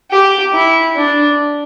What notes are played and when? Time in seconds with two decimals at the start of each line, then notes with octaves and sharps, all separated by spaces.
0.11 G4
0.53 E4
0.96 D4